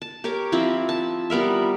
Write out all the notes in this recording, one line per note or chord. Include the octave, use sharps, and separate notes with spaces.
A5
G4 A#4 C#5 D6
F3 C4 E4 F4
A5
G3 B3 A#4 E5